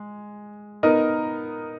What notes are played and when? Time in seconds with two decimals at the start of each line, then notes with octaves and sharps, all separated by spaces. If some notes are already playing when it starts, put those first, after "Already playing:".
Already playing: G#3
0.83 B3 D#4 A#4 D#5